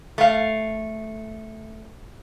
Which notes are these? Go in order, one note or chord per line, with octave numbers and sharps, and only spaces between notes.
A3 F5